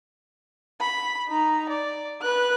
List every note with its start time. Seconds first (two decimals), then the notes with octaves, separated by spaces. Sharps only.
0.81 B5
1.29 D#4 A#5
1.69 D5
2.22 B4 F#6